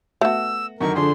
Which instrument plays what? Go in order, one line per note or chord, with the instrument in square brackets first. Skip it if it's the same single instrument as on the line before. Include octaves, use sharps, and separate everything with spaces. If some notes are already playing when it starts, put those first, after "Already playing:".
[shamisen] A3 B3 [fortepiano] F#4 [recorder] E6
[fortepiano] F#2 D3 D#3 [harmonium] A#4 [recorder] C#6
[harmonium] D3 [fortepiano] F3 D4 G#4 [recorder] C6